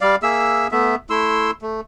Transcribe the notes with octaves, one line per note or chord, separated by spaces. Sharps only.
G3 D5 F5
A#3 G#4 E5 E6
A3 B3 E5
A3 E4 C6 E6
A3